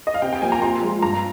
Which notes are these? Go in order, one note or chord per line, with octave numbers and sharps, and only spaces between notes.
D#5
F5
C3 G5
G5
F3 A#3 G#5
A#5
A#2 C6
F3 G#3
G2 A#5